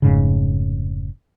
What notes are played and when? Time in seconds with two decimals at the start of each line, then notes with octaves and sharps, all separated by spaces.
0.02 F1 G#2 C#3